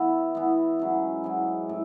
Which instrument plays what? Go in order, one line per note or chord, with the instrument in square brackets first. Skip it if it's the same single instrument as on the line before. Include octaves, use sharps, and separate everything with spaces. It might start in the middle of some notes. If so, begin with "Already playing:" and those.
Already playing: [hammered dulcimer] E3 B3 E4
E3 B3 E4
G#2 F#3 C#4 E4
G#2 F#3 C#4 E4
A2